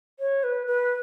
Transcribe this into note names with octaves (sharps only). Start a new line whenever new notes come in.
C#5
B4
B4